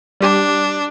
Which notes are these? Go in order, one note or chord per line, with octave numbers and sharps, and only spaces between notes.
G3 D4 G4